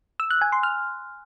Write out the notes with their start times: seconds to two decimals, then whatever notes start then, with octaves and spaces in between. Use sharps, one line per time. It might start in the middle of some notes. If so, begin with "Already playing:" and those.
0.20 E6
0.31 F#6
0.41 G#5
0.52 C6
0.63 F6